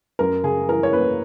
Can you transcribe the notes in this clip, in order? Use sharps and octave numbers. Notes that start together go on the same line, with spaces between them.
F#2 A#4
C#3 G#4
E3 A#4
C#5
A#3 B4